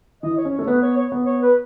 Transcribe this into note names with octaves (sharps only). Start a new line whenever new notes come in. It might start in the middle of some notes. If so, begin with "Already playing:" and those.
E3 D#5
C#5
C#4
C#5
A3
B3 B4
C#5
C#5
B3
C#5
B4